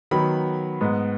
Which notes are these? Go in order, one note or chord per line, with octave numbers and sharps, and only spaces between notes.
D#3 F#3 B3 B5
G#2 G#3 B3